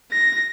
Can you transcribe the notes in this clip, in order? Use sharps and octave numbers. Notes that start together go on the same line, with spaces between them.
A#6